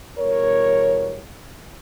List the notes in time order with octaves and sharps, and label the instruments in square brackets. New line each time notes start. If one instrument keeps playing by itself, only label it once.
[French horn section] E2 B2 G3 A#4 C#5